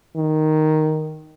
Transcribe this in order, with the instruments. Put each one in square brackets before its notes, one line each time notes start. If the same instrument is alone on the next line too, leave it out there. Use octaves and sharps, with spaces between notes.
[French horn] D#3